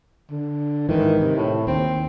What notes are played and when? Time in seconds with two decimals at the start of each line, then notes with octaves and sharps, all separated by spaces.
0.31 D3
0.89 G#2 D#3 E3
1.21 C3
1.36 A2
1.67 D#2 C4